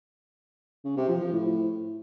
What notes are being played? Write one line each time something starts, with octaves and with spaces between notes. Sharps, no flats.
C#3
C3
F3
F3
A2